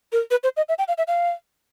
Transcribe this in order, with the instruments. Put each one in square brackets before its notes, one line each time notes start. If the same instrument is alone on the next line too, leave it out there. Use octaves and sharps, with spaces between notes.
[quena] A#4
B4
C5
D#5
E5
G5
F5
E5
F5